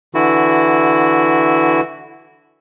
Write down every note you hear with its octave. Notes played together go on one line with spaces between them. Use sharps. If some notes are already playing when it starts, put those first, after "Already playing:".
D3 E3 E4 F#4